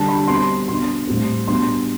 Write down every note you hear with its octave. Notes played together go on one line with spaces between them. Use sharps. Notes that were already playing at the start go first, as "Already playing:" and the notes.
Already playing: D3 G3 D4 A5
B5
B2 G3 C4 C6
B2 B3 D4 C6
A2 G3 C4
B2 G3 B3 D4 C6